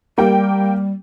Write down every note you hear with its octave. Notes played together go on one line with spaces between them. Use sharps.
G3 A#3 G4 G5